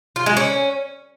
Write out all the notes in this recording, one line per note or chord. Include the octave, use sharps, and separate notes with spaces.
F4
G#3
C#4